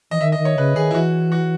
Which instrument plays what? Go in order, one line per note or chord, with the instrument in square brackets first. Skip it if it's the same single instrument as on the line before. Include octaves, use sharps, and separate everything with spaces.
[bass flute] E3 [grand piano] D#5
[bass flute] D#3 [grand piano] E5
[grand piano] D#5
[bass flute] D#3
[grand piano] C#5
[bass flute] C#3 [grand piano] B4
[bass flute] D#3 [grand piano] G#4
[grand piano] E4
[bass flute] E3 [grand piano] F#4
[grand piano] F#4